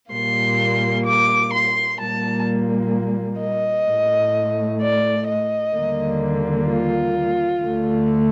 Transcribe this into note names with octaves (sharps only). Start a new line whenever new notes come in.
A#2 G3 A#3 C6
D6
C6
A#2 G3 A#3 A5
D#5
A2 A3
D5
D#5
D#2 D3 G3 A#3
F4
D2 D3 A3